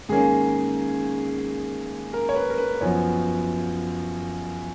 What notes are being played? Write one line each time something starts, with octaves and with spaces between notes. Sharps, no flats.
G#2 D#3 A#3 C#4 G#4
A#4
C#5
B4
A#4
B4
F#2 F3 B3 C#5